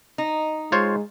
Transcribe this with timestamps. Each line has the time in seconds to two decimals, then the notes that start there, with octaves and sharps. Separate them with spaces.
0.18 D#4
0.72 G#3 F4 C5 C#5